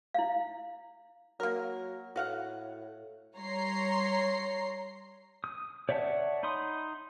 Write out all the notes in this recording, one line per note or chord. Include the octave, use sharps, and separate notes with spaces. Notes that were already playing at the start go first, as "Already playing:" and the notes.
E4 F5
F#3 A#3 A#4
A2 F#4 F5 F#5
G3 C#5 A#5 C6 C7
D#6
C#5 D5 E5 F#5 A5
D#4 B5 C6 D#6